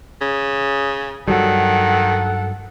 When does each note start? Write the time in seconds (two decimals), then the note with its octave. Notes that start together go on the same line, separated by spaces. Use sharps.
0.21 C#3
1.28 G2 D#3 F#3 G3 A4 F#5